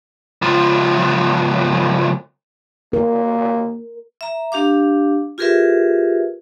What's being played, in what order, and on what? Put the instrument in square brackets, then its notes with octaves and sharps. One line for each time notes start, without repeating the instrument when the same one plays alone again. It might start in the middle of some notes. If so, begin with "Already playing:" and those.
[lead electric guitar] C#2 F3
[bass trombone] A#3 [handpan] A#4
[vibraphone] E5 A#5
D4 G4 F5 D6
F4 G4 G#4 A#4 B4 E5